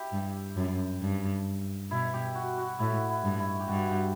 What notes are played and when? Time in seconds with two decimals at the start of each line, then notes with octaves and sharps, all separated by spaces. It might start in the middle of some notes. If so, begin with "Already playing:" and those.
Already playing: E4 G4
0.12 G2
0.57 F#2
1.02 G2
1.91 B2 E4
2.14 G4
2.35 F#4
2.57 F#4
2.79 A2 E4
3.10 E4
3.24 G2
3.40 E4
3.60 G4
3.68 G2 F#4
3.91 G4